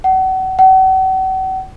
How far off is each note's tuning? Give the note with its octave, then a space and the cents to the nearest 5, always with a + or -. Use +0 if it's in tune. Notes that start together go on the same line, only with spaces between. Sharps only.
F#5 +35
F#5 +40